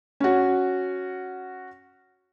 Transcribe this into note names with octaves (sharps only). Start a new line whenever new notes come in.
C#4 F#4